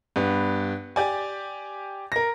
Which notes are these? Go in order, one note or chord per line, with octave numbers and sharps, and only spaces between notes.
G2 B3
G4 D5 G#5
A#4 A#6